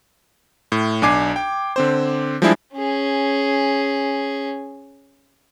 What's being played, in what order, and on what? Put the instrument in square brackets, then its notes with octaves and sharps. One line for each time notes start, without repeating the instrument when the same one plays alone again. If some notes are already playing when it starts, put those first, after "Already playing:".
[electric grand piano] A2
B1 D4 G#5 D6 G#6 C7
G5
D3 C4 C5
F3 G3 G#3 D4 E4 G#4
[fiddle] C#4 G#4